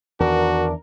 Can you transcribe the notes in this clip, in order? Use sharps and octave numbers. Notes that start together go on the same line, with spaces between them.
E2 D#3 D4 F#4 A#4